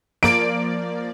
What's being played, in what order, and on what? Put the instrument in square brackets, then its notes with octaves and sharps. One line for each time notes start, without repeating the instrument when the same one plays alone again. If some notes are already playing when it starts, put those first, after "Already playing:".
[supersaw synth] F3 A#3 D5 [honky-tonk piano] D7